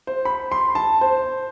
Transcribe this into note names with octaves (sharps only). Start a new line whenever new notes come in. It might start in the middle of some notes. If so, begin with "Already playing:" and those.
C5
B5
C6
A5
C5